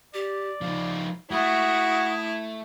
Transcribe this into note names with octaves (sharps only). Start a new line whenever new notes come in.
G4 D5
F3 D#4 F5
A3 E4 F#4 D#6